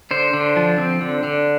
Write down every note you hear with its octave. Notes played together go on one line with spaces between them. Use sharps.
D3 C5
D3
F3
C4
D3
D3